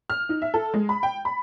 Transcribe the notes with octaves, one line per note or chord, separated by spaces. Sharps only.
F6
D#4
E5
A4
G#3
B5
G5
B5